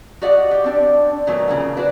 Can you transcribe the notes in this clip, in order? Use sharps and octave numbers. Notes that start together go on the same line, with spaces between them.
F#4 G4 D5 D#5 F#5
G4
C4 D4 D5
A#2 D#3 F#3 A3 B3
C#3 F3 A#3
F#4 B4 C5 D5